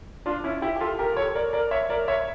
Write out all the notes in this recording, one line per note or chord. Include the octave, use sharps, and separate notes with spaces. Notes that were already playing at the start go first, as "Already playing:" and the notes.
D4 F4
C#4 E4
E4 G4
G4
F4 A4
G4 A#4
A4 C#5
A#4 D5
A#4 D5
C#5 E5
A#4 D5
C#5 E5